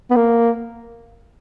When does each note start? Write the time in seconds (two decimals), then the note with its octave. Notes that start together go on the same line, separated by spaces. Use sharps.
0.10 B3
0.16 A#3